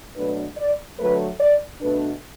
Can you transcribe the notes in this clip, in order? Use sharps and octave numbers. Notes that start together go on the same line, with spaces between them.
B2 F#3 A3 D4 B4
D5
D3 F#3 A3 B4
D5
B2 A3 D4 B4